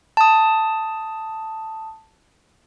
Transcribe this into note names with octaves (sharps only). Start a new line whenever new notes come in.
A5 D#6